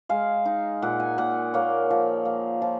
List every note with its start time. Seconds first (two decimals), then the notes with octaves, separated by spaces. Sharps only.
0.09 G#3 F5
0.45 D#4
0.82 A#2 F#5
1.00 G#5
1.18 A#2 F#5
1.54 A#3 C#5
1.90 F3
2.25 A#3
2.62 F3